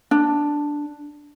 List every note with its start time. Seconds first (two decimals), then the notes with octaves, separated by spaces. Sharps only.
0.11 D4